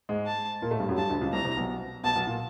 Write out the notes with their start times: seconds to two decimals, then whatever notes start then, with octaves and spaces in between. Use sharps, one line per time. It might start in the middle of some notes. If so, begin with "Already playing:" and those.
0.09 G#2 G#3
0.27 A5
0.62 A#2 A#3
0.71 A2 A3
0.80 G2 G3
0.89 F#2 F#3
0.97 G2 G3 A5
1.09 D2 D3
1.21 C#2 C#3
1.33 C2 C3 A#5
1.45 C2 C3
1.57 B1 B2
2.04 B1 B2 A5
2.16 B1 B2
2.27 A#2